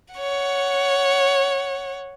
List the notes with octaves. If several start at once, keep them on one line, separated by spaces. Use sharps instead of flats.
C#5 F#5